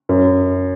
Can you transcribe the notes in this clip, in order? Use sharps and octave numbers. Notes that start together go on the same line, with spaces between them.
F#2